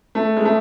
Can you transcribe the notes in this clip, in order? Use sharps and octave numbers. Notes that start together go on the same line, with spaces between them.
A3
G#3
A3